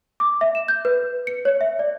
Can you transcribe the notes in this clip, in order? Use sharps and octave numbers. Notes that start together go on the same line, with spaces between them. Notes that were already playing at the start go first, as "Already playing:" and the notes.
D6
E5
E7
G6
B4
C#7
C#5
E5
D5